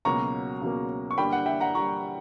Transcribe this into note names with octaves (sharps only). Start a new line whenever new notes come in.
C#2 B2 F#3 A#3 A#5 C#6
C#2 B2 F#3 A#3
C#6
G2 D3 G3 A#3 G5 B5
F#5
E5 G5
F#5 A#5
G2 D3 G3 A#3 A#5 C#6